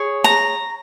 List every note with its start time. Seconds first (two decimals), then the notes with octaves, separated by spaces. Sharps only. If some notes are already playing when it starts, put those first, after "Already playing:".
Already playing: G#4 C#5
0.24 A#5